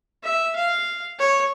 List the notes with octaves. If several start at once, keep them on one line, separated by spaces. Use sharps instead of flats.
E5
F5
C#5